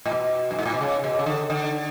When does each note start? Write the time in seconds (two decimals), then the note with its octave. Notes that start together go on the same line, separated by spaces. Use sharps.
0.05 A2
0.12 B2
0.51 F#2
0.59 G#2
0.65 A2
0.74 B2
0.81 C#3
1.04 B2
1.19 C#3
1.26 D3
1.50 D3